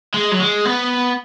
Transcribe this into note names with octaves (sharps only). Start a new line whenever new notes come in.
G#3
F#3
G#3
B3